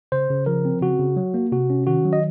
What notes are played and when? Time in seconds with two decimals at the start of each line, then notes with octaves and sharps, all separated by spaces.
0.12 C#3 C5
0.30 C#3
0.46 F3 A#4
0.65 C4
0.82 C#3 F#4
0.99 C#3
1.17 F#3
1.34 A#3
1.52 C3 F#4
1.70 C#4
1.87 D#3 F#4
2.05 F#3
2.13 D#5